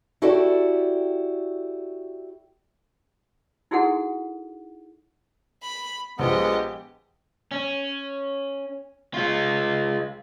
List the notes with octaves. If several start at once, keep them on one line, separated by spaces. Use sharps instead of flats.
E4 F#4 G4 A4 D5
D#4 E4 F#4 G#4 A4 F#5
B5
A#1 G#3 B3 G4 D#5
C#4
G#3 F4